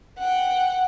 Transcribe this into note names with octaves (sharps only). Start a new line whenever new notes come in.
F#5 G5